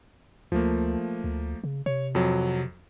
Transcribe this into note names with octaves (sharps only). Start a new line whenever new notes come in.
D2 F3 A3 A#3
D2
C#3
C3 C#5
F2 F#3